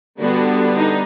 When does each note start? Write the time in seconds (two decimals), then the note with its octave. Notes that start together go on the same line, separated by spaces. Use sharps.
0.19 D3 G3 B3 D4 F#4
0.74 D#4